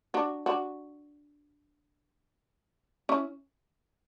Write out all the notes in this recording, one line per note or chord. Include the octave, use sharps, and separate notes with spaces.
D4 F#4
D4 F#4
C#4 E4